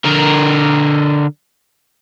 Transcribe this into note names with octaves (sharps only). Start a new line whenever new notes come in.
D3 A#4